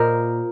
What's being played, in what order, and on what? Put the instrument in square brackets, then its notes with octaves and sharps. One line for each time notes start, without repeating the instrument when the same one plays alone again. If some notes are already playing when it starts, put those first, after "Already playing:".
Already playing: [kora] A#2 A#4 C5 D#5